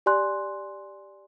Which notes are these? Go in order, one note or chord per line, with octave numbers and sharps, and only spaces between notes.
G4 D5 G#5 C6 F#6